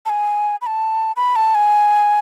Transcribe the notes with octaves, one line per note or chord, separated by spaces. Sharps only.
A5
G#5
B5
A5
B5
A5
G#5